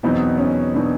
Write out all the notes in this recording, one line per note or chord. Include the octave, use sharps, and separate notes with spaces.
E2 B2 F#3 B3 C4 D#4
C#4
B2 F#3 B3 D4 D#4